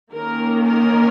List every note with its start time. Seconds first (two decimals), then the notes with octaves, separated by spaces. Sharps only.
0.14 D#3 A#3 C#4 A#4
0.62 A#4